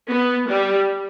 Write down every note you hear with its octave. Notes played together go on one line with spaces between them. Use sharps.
B3
G3